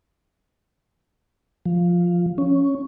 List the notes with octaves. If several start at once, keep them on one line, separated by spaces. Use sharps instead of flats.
F3
C#4